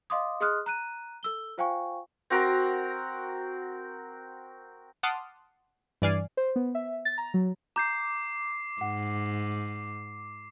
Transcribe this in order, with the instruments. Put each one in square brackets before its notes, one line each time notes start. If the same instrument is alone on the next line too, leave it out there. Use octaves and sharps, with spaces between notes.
[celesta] D#5 F5 C6 D6 D#6
G#4 D#5 C6 D#6 F6 F#6
A#5 F#6 D#7
A4 E6 G7
F4 C5 F5 G5 G#5 C#6
[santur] C4 F#4 A#4
[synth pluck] F#5 A5 C6 D6 D#6 F6
G2 E3 D5 G#5 F6 C7
[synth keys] C5
B3
E5
A6
A#5
F#3
[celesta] A#5 G6 [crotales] D6 C7
[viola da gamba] G#2 [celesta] F#5